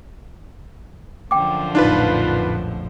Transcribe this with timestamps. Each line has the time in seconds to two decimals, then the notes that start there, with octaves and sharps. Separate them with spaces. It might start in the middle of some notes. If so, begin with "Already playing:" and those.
1.31 F#2 D3 F3 G5 D6
1.75 A#1 F2 A2 D4 D#4 F4 B4